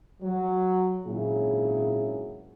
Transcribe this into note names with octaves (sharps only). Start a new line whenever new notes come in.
F#3
G#1 A#2 C#3 F#3 E4 G#4